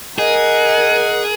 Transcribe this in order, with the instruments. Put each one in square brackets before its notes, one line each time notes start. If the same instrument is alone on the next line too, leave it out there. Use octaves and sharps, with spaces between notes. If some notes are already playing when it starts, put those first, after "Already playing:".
[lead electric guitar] G#4 [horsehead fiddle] A#4 [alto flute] D#5 [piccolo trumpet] F#5